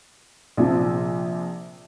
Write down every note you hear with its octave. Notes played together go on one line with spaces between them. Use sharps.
A#1 C3 F3